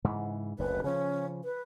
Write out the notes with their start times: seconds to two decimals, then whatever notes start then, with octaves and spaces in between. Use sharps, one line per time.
0.05 G#2 C#3 E3
0.59 F#1 D2 B4
0.84 C#3 F3 C#4
1.44 B4